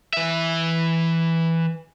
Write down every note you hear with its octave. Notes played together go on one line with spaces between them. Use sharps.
E3 E5